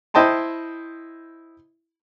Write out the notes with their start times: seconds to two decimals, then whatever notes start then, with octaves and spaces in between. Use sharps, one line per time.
0.14 E4 C5 D#5 G5 A5 C6